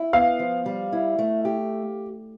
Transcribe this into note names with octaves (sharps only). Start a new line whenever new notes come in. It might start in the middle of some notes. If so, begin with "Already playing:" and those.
Already playing: E4
B3 F5
F3
G3
E4
A3
G4